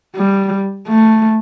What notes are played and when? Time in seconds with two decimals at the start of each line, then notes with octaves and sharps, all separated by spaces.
0.16 G3
0.89 A3